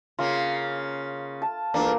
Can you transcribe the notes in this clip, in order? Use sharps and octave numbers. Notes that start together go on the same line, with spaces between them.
C#3 A#3 F4
A5
E2 A#2 A#3 D4